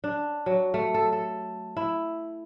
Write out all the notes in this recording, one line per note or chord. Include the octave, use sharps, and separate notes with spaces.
D4
F#3
A3
A4
A4
E4